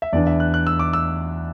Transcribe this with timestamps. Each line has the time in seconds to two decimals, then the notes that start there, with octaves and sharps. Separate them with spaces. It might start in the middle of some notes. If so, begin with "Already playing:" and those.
0.02 E5
0.12 E2 E3 D4 D5
0.27 E5
0.40 F#6
0.54 F#6
0.67 E6
0.79 D6
0.93 E6